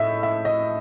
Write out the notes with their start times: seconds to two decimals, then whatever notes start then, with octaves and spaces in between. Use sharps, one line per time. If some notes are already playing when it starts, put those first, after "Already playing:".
Already playing: A2 D#5 E5
0.23 E5
0.45 D#5